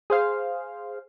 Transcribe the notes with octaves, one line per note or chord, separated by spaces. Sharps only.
G#4 C5 F5